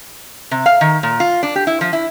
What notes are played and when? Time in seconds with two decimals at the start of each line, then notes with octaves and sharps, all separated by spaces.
0.51 C3
0.66 F5
0.81 D#3
1.03 A#2
1.20 F4
1.43 D4
1.56 G4
1.67 E4
1.81 F3
1.93 E4